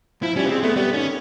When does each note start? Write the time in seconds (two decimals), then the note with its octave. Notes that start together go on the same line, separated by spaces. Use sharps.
0.23 F3 E4
0.36 G3 C#4
0.45 B3
0.49 G#3 C4
0.63 A3 B3
0.76 G3 B3
0.93 D#3 C#4